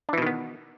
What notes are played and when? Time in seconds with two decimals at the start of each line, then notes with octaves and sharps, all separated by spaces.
0.09 D4
0.13 E3
0.18 B2
0.22 D#3
0.27 B3